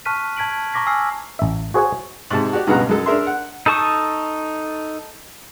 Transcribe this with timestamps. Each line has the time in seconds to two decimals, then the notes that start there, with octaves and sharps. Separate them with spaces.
0.05 A5 C#6 F6 F#6 B6 D#7
0.36 A5 G#6 B6 D7 F#7
0.74 A#5 C#6 D6 A#6 B6
0.87 G#5 E6 F6 C7
1.39 A1 E5
1.74 F#4 G#4 C5 C#5 F#5 G#5
2.30 G#2 C3 A5
2.53 F#4 G4 D5
2.67 C#2 G2 B2 B3 F#5 A#5
2.89 F#2 G#3 A4
3.06 D4 G#4 A#4 E5 C6
3.27 F#5
3.66 D#4 A4 A5 C#6 D#6